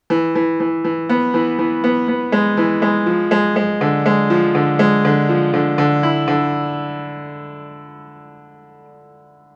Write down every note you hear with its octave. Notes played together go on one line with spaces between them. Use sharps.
E3
E3
E3
E3
B3
E3
E3
B3
B3
G#3
E3
G#3
F3
G#3
G#3
D3
G#3
F3
D3
G#3
D3
F3
D3
D3
E4
D3